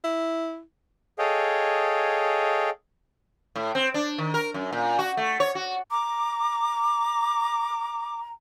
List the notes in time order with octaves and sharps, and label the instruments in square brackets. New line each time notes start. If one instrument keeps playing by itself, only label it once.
[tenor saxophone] E4
[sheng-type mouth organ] G#4 A4 C#5 D#5 F5 G5
[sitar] A2
C4
D4
D#3
A#4
F#2
A#2
F#4
A3
C#5
F#4
[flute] A#5 [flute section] D6